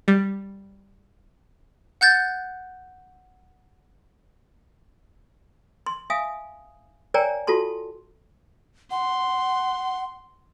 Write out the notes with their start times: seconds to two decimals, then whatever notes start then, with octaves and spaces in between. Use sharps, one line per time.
0.08 G3
2.01 F#5 F#6 G6 A6
5.86 C6
6.10 E5 F5 G#5 D#6
7.14 A#4 C#5 D5 G5 G#5 A#5
7.47 F4 F#4 A4 A5 C6
8.91 F#5 C6